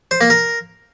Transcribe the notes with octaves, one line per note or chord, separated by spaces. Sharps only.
C5
A#3
A#4